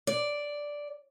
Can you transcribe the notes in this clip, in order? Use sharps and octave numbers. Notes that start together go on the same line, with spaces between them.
D5